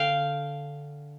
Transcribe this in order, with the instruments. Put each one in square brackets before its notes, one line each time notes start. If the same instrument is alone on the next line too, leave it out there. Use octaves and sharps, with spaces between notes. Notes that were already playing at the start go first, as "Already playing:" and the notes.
Already playing: [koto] D3 F5 G5